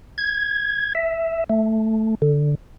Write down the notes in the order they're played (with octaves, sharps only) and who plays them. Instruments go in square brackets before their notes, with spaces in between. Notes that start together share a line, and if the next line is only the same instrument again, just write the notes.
[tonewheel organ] G#6
E5
A3
D3